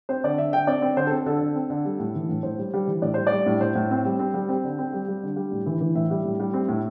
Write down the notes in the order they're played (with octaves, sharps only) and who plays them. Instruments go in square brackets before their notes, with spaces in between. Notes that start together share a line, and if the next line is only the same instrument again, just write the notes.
[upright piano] C4 C5
D3 D5
D3 E5
D3 G5
C4 D5
C4
D3 C5
C4 A4
D3 A4
D3
C4
D3
G3
A2
E3
A2
A2 C5
G3
G3
E3
A2 D5
G3 C5
G3 D5
A2
A2 C5
A2
C4
G3
C4
G3
C4
D3
C4
G3
G3
D3
G3
A2
E3
E3
A2 E5
G3
A2
G3
C4
A2